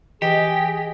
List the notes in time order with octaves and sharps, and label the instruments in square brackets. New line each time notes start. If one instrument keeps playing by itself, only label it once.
[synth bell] E3 D#5 A#6 [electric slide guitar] G4 [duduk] G#4